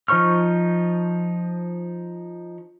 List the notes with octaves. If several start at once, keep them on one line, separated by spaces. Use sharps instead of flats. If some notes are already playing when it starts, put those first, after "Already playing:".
F3 D#4 C5 C#6 F6